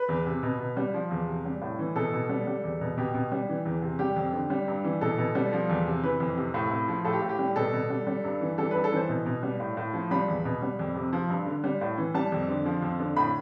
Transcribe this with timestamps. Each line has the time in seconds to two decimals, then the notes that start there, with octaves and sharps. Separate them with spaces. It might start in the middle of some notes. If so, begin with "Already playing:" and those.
Already playing: B4
0.09 E2
0.26 C3
0.43 B2
0.60 B2
0.77 G3
0.94 F3
1.11 E2
1.28 C3
1.45 G3
1.62 A2
1.79 E3
1.96 B2 A4
2.13 B2
2.29 G3
2.47 G3
2.64 E2
2.81 B2
2.97 B2 G4
3.14 B2
3.32 G3
3.49 E3
3.65 E2
3.82 C3
3.99 G3 G4
4.16 F2
4.33 D3
4.50 G3
4.68 G2
4.85 E3
5.01 B2 A4
5.18 B2
5.35 G3
5.53 F3
5.69 E2
5.87 C3
6.03 E3 B4
6.20 F2
6.37 C3
6.54 A2
6.71 A2
6.88 F3
7.05 A2 A4
7.13 G4
7.22 A2
7.29 G4
7.39 G3
7.56 B2 A4
7.73 B2
7.90 G3
8.07 G3
8.24 G2
8.41 E3
8.58 G3 A4
8.71 G2 B4
8.84 A4
8.92 E3 C5
9.09 B2
9.26 B2
9.43 G3
9.60 A2
9.77 A2
9.93 F3
10.11 G3 B5
10.28 E2
10.45 B2
10.62 G3
10.79 F2
10.96 C3
11.13 F3
11.30 G2
11.46 D3
11.64 G3
11.81 A2
11.98 E3
12.14 G3 A5
12.32 F2
12.49 D3
12.66 F3
12.82 F2
13.00 D3
13.17 A2 B5